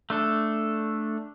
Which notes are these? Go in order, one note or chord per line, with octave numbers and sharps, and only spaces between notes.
A3 D4 A4